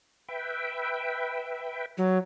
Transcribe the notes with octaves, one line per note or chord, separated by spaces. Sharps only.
B4 E5 G5
F#3